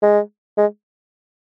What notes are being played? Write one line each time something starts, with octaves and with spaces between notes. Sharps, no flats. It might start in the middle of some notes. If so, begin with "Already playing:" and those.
G#3
G#3